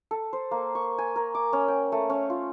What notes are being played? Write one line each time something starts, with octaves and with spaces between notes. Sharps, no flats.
A4
C5
A#3
C#6
G#5
A#4
D6
C#4
G5
A3
C#4
F4